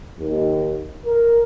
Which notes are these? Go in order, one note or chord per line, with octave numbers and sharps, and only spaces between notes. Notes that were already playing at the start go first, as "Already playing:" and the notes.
D#2
A#4